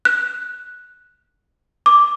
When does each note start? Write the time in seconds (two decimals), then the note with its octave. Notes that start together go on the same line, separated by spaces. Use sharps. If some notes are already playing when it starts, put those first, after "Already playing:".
0.05 F#6
1.86 D6